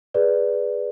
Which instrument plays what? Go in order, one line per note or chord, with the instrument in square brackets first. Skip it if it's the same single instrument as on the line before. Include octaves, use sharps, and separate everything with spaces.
[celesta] G#4 B4 D5